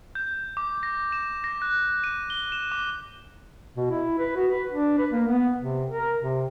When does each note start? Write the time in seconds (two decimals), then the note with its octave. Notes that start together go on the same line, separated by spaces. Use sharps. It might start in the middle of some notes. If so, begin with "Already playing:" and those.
0.15 G6
0.57 D6
0.83 A#6
1.12 E7
1.44 A#6
1.62 F#6
2.04 D#7
2.30 G7
2.52 E7
2.72 D6
3.77 B2
3.91 E4
4.19 B4
4.36 F#4
4.51 B4
4.71 D4
4.98 B4
5.11 A#3
5.28 B3
5.60 C3
5.90 A#4
6.19 C3